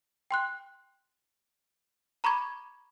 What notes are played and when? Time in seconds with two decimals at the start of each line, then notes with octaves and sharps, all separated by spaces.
0.31 G5 C6 F#6
2.24 A#5 B5 C#6 D6 G#6